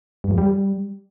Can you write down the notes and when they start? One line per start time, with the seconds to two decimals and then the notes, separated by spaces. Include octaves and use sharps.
0.24 G2
0.31 F2
0.38 G3